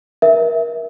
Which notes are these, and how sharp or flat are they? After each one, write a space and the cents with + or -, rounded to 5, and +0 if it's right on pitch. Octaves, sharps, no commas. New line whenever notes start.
A#4 +25 E5 +0